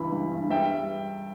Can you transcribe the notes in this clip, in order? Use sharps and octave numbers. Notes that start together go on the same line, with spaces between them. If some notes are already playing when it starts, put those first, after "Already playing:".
Already playing: C#2 G2 E3 B5
G3
G2
G3 E5 G5